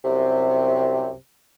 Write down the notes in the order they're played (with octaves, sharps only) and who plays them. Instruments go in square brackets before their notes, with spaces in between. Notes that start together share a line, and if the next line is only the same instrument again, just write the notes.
[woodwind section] C2 F#2 C3